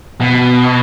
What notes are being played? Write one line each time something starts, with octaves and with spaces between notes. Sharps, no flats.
B2